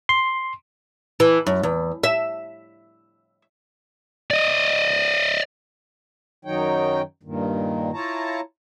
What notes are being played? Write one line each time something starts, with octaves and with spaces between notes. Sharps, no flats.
C6
E3
F#2
E2
E5
D5 D#5
F#2 D#3 F#3 D#4 C#5 G5
G2 A#2 D#3
E4 F4 C#5 A5 A#5